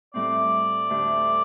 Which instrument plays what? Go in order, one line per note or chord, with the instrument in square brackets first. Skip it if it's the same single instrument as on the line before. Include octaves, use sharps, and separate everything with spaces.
[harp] A2 G3 C4 [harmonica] D5
[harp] D2 D3 A3 D4 G4